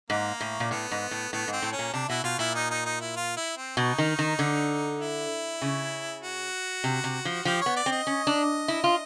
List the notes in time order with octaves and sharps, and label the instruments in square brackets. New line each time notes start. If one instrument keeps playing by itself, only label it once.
[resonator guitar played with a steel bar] G#2 [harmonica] A#3
[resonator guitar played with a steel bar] A2
A#2
[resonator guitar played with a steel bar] A2 [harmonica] B3
[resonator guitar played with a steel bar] G#2
A2
[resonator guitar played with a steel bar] A2 [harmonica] B3
[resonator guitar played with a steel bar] G#2 [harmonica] C4
[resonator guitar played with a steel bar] A2
[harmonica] C#4
[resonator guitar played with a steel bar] A#2
[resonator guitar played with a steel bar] C3 [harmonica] D4
[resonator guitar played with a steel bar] B2 [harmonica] E4
[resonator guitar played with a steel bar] B2 [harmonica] F4
[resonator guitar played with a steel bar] A#2 [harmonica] E4
[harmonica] D#4
D#4
D#4
E4
F4
E4
C4
[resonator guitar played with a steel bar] B2 [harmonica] D#4
[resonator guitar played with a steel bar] D#3
D#3
D3
[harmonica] E4
[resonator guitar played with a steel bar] C#3
[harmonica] F#4
[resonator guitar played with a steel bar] C3
C3
F3
[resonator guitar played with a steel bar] F3 [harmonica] G4
[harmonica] C#5
[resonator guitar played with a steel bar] B3
[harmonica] D5
[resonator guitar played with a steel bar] C4
[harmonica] D#5
[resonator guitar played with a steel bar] C#4
D4
E4
F4